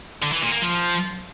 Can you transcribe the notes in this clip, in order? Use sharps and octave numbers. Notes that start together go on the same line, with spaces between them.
D3
E3
A#2
A#3
F3